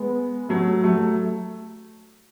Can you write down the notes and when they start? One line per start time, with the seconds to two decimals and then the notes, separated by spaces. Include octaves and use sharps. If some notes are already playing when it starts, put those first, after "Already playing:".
Already playing: G#3 B3
0.49 F#3 A3
0.84 F#3 A3